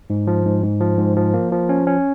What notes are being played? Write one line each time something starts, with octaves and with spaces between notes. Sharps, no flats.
G#2
F3
G#2
G#2
F3
G#2
F3
A#3
F3
C#4
C#4